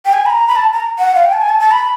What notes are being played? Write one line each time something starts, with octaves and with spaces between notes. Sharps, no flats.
G5
G#5
B5
A#5
B5
A5
A#5
F#5
F5
G5
A5
G#5
A5
A5
B5